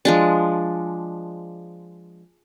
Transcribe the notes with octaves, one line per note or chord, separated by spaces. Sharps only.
F3 G#3 D4